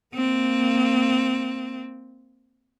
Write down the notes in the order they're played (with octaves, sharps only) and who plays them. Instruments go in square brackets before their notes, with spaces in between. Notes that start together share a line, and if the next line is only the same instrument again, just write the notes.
[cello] A#3 C4